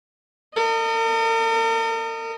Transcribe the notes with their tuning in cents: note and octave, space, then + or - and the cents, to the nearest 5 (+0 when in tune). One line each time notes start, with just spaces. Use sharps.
A#4 -45 D#5 -10